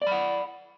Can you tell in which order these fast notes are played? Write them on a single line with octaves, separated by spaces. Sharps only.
D5 B5 F#5